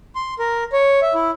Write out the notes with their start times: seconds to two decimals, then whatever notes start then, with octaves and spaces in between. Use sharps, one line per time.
0.15 C6
0.39 A#4
0.73 C#5
1.02 E5
1.14 E4